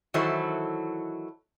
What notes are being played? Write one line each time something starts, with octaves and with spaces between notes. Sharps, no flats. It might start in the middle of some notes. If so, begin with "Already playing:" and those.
D#3 E3 F#3 E4 A4 C5